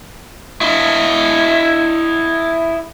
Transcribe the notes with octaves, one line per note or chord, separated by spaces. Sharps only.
E4 D#5